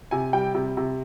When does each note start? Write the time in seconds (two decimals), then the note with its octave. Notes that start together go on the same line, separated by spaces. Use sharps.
0.11 C3 G#5
0.33 G3 G5
0.55 C3
0.77 C3